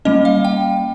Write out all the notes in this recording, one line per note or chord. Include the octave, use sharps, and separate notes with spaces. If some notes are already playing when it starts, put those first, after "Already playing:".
G3 A#3 C#4 D#5
F5
G5